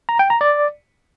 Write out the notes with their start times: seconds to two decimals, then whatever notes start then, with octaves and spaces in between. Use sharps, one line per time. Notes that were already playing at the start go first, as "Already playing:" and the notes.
0.09 A#5
0.19 G5
0.30 A#5
0.41 D5